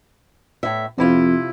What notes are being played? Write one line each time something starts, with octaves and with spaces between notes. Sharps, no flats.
A2 E5
F2 C3 E4 F4